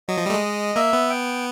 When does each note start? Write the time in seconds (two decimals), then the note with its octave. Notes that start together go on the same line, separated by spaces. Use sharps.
0.08 F#3 D#5
0.17 F3
0.26 G3
0.30 A3
0.34 G#3
0.76 A#3 E5
0.93 B3
1.10 G5